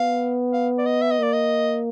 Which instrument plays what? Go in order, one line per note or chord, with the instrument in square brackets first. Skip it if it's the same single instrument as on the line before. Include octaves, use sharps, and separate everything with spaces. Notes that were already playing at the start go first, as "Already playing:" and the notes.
Already playing: [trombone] B3 [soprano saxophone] F5
[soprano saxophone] F5
D5
D#5
E5
D#5
[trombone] A#3 [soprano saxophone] D5
[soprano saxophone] D#5